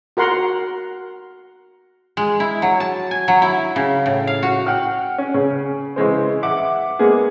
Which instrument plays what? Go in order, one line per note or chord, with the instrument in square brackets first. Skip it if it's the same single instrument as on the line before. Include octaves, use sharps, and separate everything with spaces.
[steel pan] F#4 A#4 F#5 C6
[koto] G#3
E4
F#3
A5
G#5
F#3
E4
C#3
A2
F5
F#4
[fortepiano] F#5 G5 F6
C#4
C#3
C#3 E3 G#3 C5
E5 F#5 D6
G#3 A#3 B3 G#4